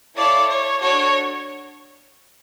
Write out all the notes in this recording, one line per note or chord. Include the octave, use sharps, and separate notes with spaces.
E4 A4 C#5 D5 F5 A5
C#5
D4 F#4 A4 C#5